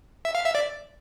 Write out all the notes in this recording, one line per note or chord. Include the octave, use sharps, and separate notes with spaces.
E5
F5
E5
D5